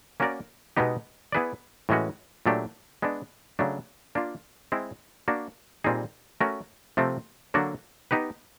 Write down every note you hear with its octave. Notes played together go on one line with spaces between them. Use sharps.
A#3 C#4 F#4 A#4 D5
B2 G#3 B3 D#4 G4
B3 E4 G#4 B4 D5
A2 E3 G#3 C#4 F#4
A#2 F#3 A3 D4 G4
G#3 B3 D4
C#3 F#3 A3 D4
A#3 D4 F4
G#3 C4 E4
A#3 D4 F#4
A#2 G3 C4 D#4 G#4
A3 C#4 F#4 A#4
C3 F3 A3 C4
D3 F#3 A#3 D4 F#4
B3 D#4 G4 B4